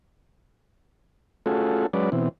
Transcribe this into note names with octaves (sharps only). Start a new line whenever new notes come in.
A3 C#4 F4 F#4 G#4 A4
F#3 G#3 C#4 B4 D5
B2 E3 C4